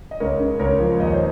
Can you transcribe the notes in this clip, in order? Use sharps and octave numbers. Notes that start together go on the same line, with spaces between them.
D#5
C#2 A#4 C#5
C#3
C#2 A#4 C#5
F3
D#2 D#5
C#5
C5 D#5